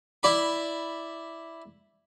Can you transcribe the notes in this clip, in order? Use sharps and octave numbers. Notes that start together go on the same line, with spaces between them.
E4 D5 B5